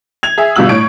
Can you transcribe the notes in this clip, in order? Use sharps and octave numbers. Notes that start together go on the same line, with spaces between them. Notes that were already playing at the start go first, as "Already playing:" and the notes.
G#6 F7
G#4 E5
G1 B2 G3 F4 E6 F#7
A2 C#5 C#6 D7